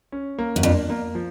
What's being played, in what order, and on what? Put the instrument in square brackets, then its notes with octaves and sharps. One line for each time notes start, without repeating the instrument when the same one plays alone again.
[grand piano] C#4
A#3
[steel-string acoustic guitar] F#2
[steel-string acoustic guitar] F2 [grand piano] D4
[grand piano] A#3
F3